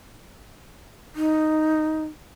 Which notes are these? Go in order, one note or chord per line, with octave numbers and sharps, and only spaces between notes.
D#4